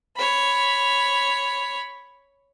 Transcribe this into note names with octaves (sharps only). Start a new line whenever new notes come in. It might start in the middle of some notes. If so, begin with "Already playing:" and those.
C#5 B5